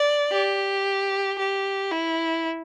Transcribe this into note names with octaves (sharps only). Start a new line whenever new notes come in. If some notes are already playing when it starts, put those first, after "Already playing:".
Already playing: D5
G4
G4
E4